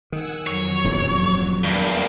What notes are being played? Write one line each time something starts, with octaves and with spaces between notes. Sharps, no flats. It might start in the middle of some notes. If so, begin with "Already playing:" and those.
D#3 F#5 G#5 E6
F2 F#3 C#5
D#1 E2 G2
E2 G2 A#4